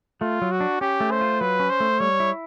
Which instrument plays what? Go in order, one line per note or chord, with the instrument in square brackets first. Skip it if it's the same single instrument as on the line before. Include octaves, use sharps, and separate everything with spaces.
[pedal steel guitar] A3 [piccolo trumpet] F4
[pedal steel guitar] F#3
[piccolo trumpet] F#4
[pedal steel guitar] D4
[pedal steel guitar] C#4 [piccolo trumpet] G4
[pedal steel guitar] A3
[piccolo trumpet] C5
[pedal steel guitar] F4
[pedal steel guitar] F#3 [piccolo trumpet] B4
[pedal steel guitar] C#4
[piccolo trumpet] C5
[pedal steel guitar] A3
[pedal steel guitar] G3 [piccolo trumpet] C#5
[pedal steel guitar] E4